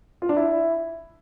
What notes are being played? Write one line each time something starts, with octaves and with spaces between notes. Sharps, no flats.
F4
D4
E4